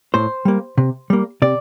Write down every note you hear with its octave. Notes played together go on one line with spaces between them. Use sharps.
A2 C5
G3 A#3
C3
G3 A#3
C3 D5